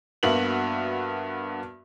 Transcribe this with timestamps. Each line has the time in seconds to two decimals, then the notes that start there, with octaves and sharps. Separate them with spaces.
0.23 G2 A#3 B3 F#4 E5 F#7